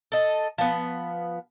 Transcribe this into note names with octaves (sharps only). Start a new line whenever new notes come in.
A4 D#5
F3 B3